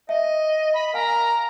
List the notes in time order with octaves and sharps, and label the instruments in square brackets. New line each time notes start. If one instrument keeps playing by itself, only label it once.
[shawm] D#5 [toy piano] E5
[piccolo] B5
[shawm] A#4 [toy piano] F5 G#5 [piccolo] A#5